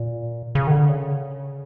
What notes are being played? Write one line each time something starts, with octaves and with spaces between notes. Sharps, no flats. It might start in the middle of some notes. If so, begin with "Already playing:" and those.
Already playing: A#2
C#3
D#3
D3
C#3